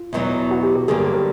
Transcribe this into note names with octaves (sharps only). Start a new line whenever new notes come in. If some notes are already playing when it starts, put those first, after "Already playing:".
Already playing: F4
E2 B2 F#3 B3 D#4
F#4
G4
G4
G2 D3 F#3 A#3 G#4
G4
A#4